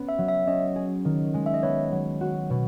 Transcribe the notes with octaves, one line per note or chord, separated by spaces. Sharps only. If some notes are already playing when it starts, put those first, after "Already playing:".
Already playing: B3 C#4
E5
F#3
E5
C#4 D#5
G#4
D#3
G#3
E5
D#5
B3 C#5
F#3
F#4
B2